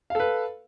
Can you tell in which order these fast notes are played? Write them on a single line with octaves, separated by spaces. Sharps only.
F5 A4 B4